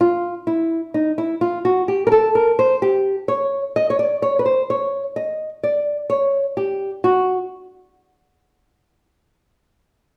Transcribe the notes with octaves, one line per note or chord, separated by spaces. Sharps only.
F4
E4
D#4
E4
F4
F#4
G4
A#4
A4
A#4
C5
G4
C#5
D#5
C#5
D5
C#5
B4
C5
C#5
D#5
D5
C#5
G4
F#4